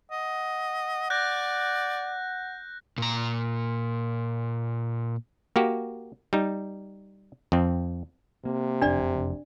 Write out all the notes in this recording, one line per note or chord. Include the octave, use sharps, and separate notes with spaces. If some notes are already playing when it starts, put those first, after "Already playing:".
D#5 F#5
D5 F#6 G6 A#6
A#2 A#5
A#3 F#4 G4
G3 D#4
F2 C4
C3 A#3
F#1 F2 D4 D5